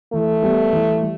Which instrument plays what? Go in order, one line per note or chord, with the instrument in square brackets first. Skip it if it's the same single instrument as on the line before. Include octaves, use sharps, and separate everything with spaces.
[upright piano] E3 [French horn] A3
[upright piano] G3 B3
E3
G3